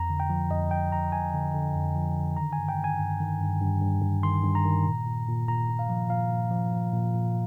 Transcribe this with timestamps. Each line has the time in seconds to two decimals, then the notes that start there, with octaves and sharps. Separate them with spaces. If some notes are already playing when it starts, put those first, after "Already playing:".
Already playing: F2 A#5
0.10 D3
0.20 G5
0.30 F3
0.51 F2 D#5
0.71 F2 G5
0.92 F2 A#5
1.12 F2 G#5
1.34 D3
1.54 D3
1.75 F2
1.96 F3
2.17 D3
2.37 D#3 A#5
2.53 G#5
2.58 G2
2.68 G5
2.79 D#3
2.84 G#5
2.99 G2
3.20 D#3
3.41 G2
3.61 G2
3.82 G2
4.02 G2
4.23 D#3 C6
4.44 G2
4.55 A#5
4.65 D#3
4.86 A#2
5.06 A#2
5.28 A#2
5.48 A#2 A#5
5.69 A#2
5.79 F5
5.89 F3
6.10 A#2 F5
6.31 A#2
6.51 F3
6.73 F3
6.92 A#2
7.14 A#2